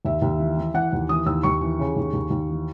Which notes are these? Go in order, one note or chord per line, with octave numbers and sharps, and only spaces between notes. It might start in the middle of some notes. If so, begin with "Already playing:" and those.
D#2 E5
D#2
E3
E3
E3 F#5
D#2
E3 D#6
D#2 E6
D#2 C#6
E3
C#3
D#2
D#2
D#2
E3